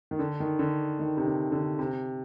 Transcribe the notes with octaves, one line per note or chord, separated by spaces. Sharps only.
D#3
D3
D#3
D3
D#3
C3
D3
D3
C3